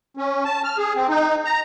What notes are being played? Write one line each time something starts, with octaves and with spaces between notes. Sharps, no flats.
C#4
A5
F6
G#4
C4
D#4
A#5